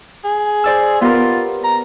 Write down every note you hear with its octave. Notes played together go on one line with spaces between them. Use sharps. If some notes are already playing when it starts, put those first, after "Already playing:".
G#4
C5 D5 E6
B3 F4 G4 A#4
A#5